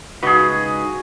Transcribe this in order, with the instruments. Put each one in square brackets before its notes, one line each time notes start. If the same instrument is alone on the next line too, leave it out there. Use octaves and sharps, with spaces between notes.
[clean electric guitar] C#2 D#4 B4 [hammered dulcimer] F#4 G#4